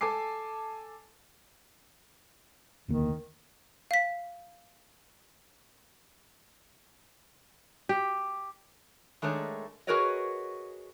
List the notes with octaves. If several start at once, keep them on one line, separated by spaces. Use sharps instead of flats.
A4 G#5 A5 D6 C7
E1 D2 D#3 A#3
F5 B6
G4
D#3 G#3 A3 D4 C#5
F#4 G#4 A#4 B4 C#5 D#5